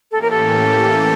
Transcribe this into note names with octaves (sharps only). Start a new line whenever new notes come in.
A2 E3 A#3 C#4 G4 A4
A#4
A4